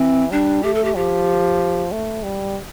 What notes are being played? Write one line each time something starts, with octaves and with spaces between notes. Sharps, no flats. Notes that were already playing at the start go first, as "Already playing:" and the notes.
Already playing: E3 C4
G3 D4
A3 G4
A4
G4
F3 G4
A3
G3